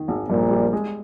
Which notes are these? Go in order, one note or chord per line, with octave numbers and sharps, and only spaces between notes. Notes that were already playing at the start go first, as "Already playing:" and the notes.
Already playing: D#3
G#1
A#1 G2 A#2
G3
G#3